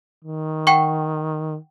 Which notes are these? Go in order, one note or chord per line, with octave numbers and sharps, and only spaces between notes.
D#3
F#5 G5 C#6